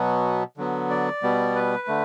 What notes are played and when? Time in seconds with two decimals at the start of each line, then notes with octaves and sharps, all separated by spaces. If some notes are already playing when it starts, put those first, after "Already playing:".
Already playing: B2 F#3 B3
0.57 D3 F#3 B3
0.90 D5
1.23 B2 G3 B3
1.56 B4
1.88 D3 A3